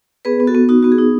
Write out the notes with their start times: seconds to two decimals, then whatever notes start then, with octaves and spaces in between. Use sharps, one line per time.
0.25 B3 G#4 B4
0.40 B3
0.47 F#4 A4
0.55 B3
0.69 D#4 F#4
0.83 B3 F#4
0.92 G#4
0.98 D#4